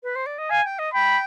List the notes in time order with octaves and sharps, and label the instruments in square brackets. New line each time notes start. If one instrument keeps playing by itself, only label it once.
[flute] B4
C5
D5
D#5
[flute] F5 [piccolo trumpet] G#5
[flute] G5
D#5
[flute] G5 [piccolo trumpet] B5